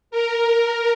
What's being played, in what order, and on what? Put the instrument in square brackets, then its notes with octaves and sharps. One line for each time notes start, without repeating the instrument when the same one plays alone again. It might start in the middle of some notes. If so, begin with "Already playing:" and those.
[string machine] A#4